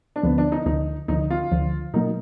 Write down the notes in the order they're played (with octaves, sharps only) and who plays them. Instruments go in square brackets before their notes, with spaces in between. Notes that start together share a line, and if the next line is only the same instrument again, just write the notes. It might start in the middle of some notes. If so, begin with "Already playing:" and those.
[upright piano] D4
[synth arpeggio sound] D2 D3 F3 [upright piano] B3
[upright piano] D4
D#4
[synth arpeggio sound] D2 D3 F3 [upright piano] D#4
[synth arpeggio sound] D2 D3 F3 [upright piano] D#4
[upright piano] F4
[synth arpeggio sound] D2 D3 F3
[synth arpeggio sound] B2 F#3 A#3 [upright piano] D#4